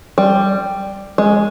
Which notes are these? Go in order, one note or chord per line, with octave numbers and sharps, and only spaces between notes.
G3
G#3